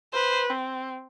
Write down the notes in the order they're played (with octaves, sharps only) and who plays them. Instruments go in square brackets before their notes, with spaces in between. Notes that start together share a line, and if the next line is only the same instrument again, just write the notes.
[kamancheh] B4 [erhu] C5
[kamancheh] C4